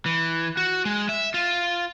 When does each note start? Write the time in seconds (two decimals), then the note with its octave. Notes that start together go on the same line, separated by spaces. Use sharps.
0.06 E3
0.57 F#4
0.85 G#3
1.09 E5
1.34 F4